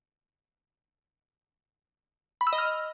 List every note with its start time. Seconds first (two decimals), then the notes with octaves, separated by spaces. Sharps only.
2.41 B5
2.47 E6
2.53 D#5
2.58 F6